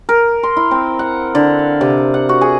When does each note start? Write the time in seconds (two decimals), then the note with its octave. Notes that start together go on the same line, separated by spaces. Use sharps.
0.09 A#4
0.43 C6
0.57 E4
0.71 C4
0.99 F#5
1.35 D3
1.59 F5
1.81 C3
2.14 F#5
2.29 F#4
2.41 G#4